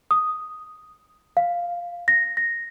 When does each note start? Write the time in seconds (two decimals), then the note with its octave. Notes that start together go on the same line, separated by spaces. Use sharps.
0.11 D#6
1.37 F5
2.08 A#6
2.37 A#6